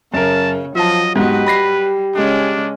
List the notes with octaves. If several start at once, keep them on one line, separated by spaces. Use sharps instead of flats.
F#2 C#3 A#4 A5
F3 F#3 F4 D#5 A5
G#2 B3 F#4 G4 B4 D#5
G3 B5 A#6 C7
C#3 G#3 C#4 D4